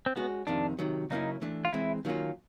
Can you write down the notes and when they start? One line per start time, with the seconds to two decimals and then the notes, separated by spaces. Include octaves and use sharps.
0.06 C4
0.16 G#3 B3 C#4 F#4
0.47 F2 C3 D#3 D4
0.79 C3 D#3 F#3
1.10 C#3 F#3 A#3 C#4 D#4 E4
1.41 E3 A3 D4
1.65 F4
1.73 E3 G#3 C4 E4
2.05 D#3 F#3 A#3 C#4 F4